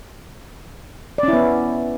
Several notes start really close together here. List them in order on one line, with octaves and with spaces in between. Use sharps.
D5 C#4 E4 B3